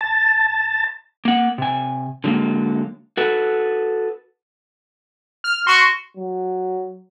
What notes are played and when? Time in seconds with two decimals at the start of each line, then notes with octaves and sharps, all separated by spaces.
0.01 A5
1.25 A#3 F#5
1.58 C3 G#5
2.24 D3 F#3 G#3 A#3
3.17 F#4 A4 B4
5.44 F6
5.67 F#4 C6 C#6
6.17 F#3